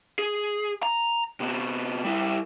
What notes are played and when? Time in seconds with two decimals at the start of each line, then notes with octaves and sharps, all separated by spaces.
0.19 G#4
0.83 A#5
1.40 C3 B3
2.04 G3 E4